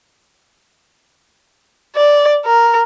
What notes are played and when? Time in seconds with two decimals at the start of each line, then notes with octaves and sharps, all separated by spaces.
1.96 D5
2.45 A#4